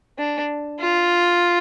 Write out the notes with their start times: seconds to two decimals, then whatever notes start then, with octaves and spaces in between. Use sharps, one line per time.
0.18 D4
0.80 F4